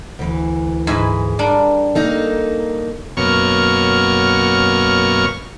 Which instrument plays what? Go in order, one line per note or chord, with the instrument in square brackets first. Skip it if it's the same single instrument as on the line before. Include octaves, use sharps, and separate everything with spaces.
[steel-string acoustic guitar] D2 E3
[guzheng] G#2 E4 B4
G3 D4 A#4
[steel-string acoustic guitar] A#3 D#4 A4
[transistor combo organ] F#2 B2 A#3 C#5 C#6 F6